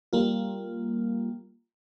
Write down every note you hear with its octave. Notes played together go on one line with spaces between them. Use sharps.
G3 A#3 F4